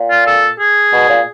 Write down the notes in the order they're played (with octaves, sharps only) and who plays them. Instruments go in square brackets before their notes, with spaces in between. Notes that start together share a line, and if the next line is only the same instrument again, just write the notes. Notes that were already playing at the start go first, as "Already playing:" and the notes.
Already playing: [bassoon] A#2
[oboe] F4
A4
G#4
[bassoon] B2
A#2